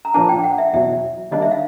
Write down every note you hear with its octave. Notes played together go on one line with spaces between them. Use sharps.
A#5
A#2 F3 A#3 D4 A5
G5
F#5
E5
E2 B2 F#3 E5
D#3 G3 A#3 D4 D#5
E5
F5